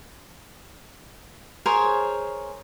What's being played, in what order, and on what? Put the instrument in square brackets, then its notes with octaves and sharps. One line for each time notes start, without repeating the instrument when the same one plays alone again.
[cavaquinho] G#4 A#4 C5 C#5